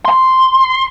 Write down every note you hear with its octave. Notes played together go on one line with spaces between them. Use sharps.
C6